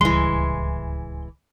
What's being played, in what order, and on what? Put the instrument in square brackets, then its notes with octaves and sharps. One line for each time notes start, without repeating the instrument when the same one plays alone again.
[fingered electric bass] D1 C#2 G3 [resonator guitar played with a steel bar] E3 G#3 [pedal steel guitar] C6